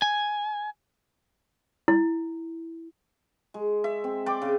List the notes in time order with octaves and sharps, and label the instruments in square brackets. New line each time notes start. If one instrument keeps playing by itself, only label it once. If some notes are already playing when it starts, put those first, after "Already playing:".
[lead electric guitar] G#5
[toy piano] E4
[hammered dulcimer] G#3
E5
C4
D5 G5 C6 D6
C#3